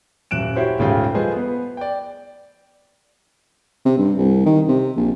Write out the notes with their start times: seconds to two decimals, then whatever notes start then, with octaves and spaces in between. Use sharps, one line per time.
0.31 D#1 F#2 F#6 D7 E7
0.55 E4 F#4 G4 C5 C#5 E5
0.79 D#1 G#2 C#3 A3 F4 G5
1.14 F3 A3 G#4 B4 C5 D#5
1.36 B3 B4
1.77 D5 G5
3.85 C3
3.98 G2
4.17 C2
4.46 D#3
4.68 C3
4.96 A#1